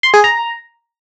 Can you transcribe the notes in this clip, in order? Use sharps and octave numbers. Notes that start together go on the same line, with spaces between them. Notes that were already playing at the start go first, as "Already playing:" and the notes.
C6
G#4
A#5